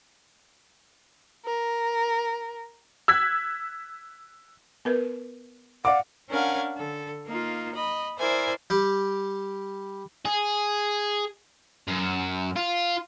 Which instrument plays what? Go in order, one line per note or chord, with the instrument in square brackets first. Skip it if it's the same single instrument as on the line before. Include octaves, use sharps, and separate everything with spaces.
[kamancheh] A#4
[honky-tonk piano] E6 F#6 G#6 B6
[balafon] B3 A#4 B4
[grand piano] D5 F5 D6 [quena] F#5
[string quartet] C#4 D4 A#4 F5 F#5 G#5
D3 A4
A#3 D#4 F4
D#5 B5
E4 A#4 C5 D5 E5 G#5
[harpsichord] G3 G4
[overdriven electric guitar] G#4
F#2
F4